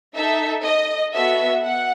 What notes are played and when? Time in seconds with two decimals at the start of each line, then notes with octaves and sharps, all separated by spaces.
0.14 D#4 A4 E5
0.64 D#5
1.13 B3 F#4 A4 E5
1.63 F#5